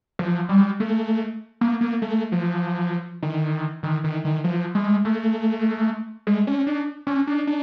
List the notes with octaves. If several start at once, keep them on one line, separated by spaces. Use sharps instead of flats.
F3
G3
A3
A#3
A#3
A3
F3
D#3
D#3
D#3
D#3
F3
G#3
A3
G#3
C#4
D4
C#4
D4
D4